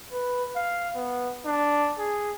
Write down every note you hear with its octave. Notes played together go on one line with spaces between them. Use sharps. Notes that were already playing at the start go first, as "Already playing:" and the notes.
B4
F5
B3
D4
G#4